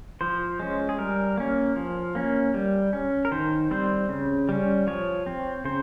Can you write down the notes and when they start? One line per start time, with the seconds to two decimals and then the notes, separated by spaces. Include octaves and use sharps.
0.21 F3 C5
0.60 G#3 C#4
0.89 G#4
0.99 G3 A#4
1.38 A#3 C#4
1.76 F3
2.15 A#3 C#4
2.54 G3
2.93 C#4
3.25 A#4
3.31 D#3 C5
3.71 G3 C4 C5
4.09 C#3
4.49 G3 C#4
4.87 F3 C#5
5.26 C4
5.65 C#3 C5